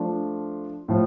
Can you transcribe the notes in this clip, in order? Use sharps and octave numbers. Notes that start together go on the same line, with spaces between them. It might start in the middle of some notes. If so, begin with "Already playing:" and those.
Already playing: F3 A3 D4 F4
A2 F3